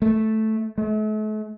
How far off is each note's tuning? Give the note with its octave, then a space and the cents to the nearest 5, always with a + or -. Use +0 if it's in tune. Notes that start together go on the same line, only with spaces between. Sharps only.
A3 -5
A3 -40